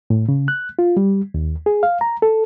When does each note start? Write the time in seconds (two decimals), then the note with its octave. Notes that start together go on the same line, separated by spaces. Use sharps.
0.10 A2
0.29 C#3
0.48 F#6
0.79 F4
0.97 G3
1.34 D#2
1.66 G#4
1.83 F5
2.01 A#5
2.22 A4